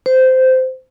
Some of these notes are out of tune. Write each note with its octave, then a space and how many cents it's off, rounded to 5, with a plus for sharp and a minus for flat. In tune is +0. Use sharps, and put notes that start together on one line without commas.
C5 -15